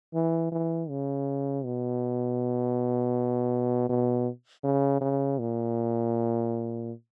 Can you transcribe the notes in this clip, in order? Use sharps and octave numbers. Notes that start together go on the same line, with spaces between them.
E3
E3
C#3
B2
B2
C#3
C#3
A#2